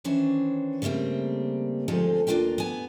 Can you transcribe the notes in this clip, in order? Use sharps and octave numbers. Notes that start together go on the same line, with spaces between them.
D#3 E3 C#4 D4 C5 C#5
C#3 G3 A3 A#3 C4
D2 F3 G#3 C4 D#4 A4
D#2 A#3 D4 F4 G4 G5
B3 G#5